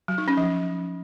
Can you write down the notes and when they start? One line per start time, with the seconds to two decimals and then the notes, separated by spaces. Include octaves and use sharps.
0.08 F#3
0.18 D#4
0.28 C#4
0.37 F3